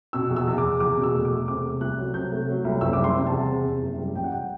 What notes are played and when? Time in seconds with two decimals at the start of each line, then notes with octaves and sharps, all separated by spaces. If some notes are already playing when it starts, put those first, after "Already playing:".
0.13 B2 E6
0.30 E2
0.36 E6
0.48 E2
0.58 D6
0.64 E2
0.80 E2 D6
0.97 B2
1.03 E6
1.14 A3
1.25 D6
1.30 E2
1.48 C3 D6
1.64 A3
1.81 C2 F#6
1.98 F#3
2.14 C3 G6
2.32 A3
2.48 F#3
2.65 C2
2.81 F#1 E6
2.93 G3 D6
3.04 C6
3.15 C3
3.27 A5
3.32 E2
3.49 C3
3.66 C3
3.82 F#1
3.99 G3
4.15 A1 G5
4.24 F#5
4.32 G5